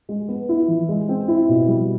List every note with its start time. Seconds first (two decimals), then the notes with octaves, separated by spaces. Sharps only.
0.09 G#3
0.28 B3
0.49 E4
0.68 E3
0.89 G#3
1.09 C4
1.28 E4
1.48 B2
1.68 G3